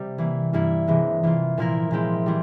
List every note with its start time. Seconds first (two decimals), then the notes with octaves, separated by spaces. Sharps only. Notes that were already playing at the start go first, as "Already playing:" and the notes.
Already playing: C3 G3
0.18 E3 A#3 E4
0.53 G2 G3 A#3 E4
0.87 C3 E3 G#3
1.23 E3 A#3 F4
1.57 A#2 F3 A#3 E4 A#4
1.91 A#2 G#3 C4 E4 G4
2.26 E3 G3 C4